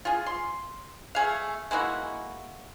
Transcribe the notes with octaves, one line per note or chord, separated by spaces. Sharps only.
F4 G#4
C6
A3 G#4 F5
G#3 A#3 E4 F#4